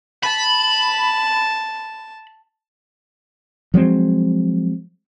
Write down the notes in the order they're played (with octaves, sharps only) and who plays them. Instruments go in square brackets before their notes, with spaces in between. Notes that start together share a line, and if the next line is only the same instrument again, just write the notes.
[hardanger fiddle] A5 [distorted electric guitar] B5
[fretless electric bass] F3 F#3 G#3 C4